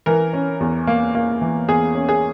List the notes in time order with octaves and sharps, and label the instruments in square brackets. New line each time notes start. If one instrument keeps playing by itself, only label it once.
[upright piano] E3 A#4
C#4
E2
A#3
A#3
E3
E2 G#4
C#4
G#4